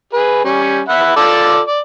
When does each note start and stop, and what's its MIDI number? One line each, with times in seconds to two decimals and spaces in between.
0.13 0.42 68
0.13 0.42 71
0.45 0.81 55
0.45 0.81 61
0.89 1.13 76
0.89 1.13 78
0.89 1.13 83
1.16 1.60 65
1.16 1.60 69
1.16 1.60 74
1.68 1.80 74